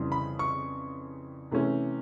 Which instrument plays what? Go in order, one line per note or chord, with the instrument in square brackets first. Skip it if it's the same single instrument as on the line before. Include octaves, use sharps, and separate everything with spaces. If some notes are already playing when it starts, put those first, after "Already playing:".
Already playing: [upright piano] F2 C#3 E3 G3 C4
B5
C#6
C3 E3 A3 C#4